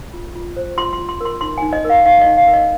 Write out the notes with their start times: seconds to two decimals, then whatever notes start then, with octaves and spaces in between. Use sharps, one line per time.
0.13 F4
0.35 F4
0.56 C5
0.78 F4 C6
0.93 C6
0.99 F4
1.09 C6
1.21 A#4 C6
1.41 D#4 C6
1.58 D#4 G#5
1.73 D#5
1.84 A#4
1.90 F5
2.06 D#4 F5
2.22 D#4 D#5
2.37 F5
2.47 A#4
2.54 D#5